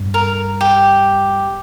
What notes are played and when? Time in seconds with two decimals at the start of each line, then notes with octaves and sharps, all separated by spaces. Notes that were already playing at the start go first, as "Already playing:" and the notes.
Already playing: G2
0.14 A#4
0.61 G4